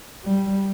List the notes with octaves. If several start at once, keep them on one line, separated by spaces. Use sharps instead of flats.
G3